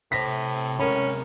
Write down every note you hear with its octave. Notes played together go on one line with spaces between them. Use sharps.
A2 C3 C5 A#6 B6
C3 G#3 C#4 A#4 B5